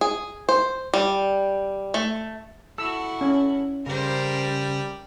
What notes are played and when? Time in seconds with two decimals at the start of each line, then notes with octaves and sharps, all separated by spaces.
0.01 G#4
0.49 C5
0.94 G3
1.94 A3
2.78 E4 F#4 A4 E6
3.21 C#4
3.86 C#3 G3 A#4 C5